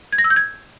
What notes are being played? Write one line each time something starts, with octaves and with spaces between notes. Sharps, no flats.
G#6
A#6
E6
G6
G#6